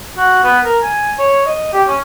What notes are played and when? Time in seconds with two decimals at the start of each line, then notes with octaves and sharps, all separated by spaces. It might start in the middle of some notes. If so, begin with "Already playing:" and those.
0.17 F#4
0.44 B3
0.64 A#4
0.83 G#5
1.19 C#5
1.46 D#5
1.73 G4
1.88 C#4